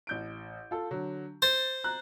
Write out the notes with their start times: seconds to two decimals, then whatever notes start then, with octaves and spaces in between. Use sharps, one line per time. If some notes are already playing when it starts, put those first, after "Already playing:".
0.07 A1 G6 D7
0.71 F4 A4
0.91 D3 F#3
1.42 C5 A6
1.84 A#5 F#6